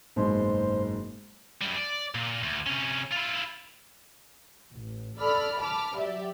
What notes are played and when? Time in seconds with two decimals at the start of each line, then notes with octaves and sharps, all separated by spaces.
0.16 F#1 G#2 B2 C5
1.62 F#2 G3
1.77 D5
2.15 A#2
2.43 D2
2.67 C3 C#4
3.12 E4 F4
4.72 A1
5.18 A4 D5 B5 F6
5.61 A5 B5 D6 F6
5.98 F#3 G4 D5 E5